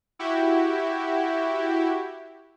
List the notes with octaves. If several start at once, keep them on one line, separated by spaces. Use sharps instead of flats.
E4 F#4 G4